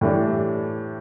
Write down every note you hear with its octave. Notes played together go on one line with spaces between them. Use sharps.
A2 E3 G3 D4